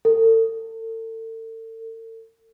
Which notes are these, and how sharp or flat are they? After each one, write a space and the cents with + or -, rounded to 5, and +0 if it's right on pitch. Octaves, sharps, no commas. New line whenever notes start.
A4 +35